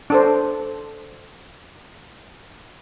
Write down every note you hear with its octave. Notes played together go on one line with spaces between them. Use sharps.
D4 A4 C5